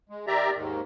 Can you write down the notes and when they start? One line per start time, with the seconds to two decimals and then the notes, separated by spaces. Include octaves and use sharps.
0.09 G#3
0.27 D#3 G4 D5 E5 A#5
0.55 D#2 G#2 D#3